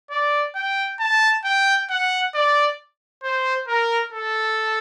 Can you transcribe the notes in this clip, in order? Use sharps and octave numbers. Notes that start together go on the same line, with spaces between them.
D5
G5
A5
G5
F#5
D5
C5
A#4
A4